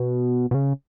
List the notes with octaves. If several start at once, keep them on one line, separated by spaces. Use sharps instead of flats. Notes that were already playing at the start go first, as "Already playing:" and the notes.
Already playing: B2
B2
C#3